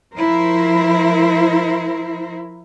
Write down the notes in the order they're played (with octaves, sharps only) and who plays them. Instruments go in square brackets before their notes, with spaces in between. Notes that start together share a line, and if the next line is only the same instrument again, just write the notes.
[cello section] F3 E4 A#4 C5